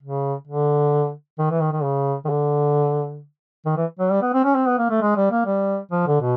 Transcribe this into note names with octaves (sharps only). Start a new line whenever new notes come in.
C#3
D3
D#3
E3
D#3
D#3
C#3
D#3
D3
D#3
E3
F#3
G3
B3
C4
C#4
C4
B3
A#3
A3
G#3
G3
A#3
G3
F3
D3
B2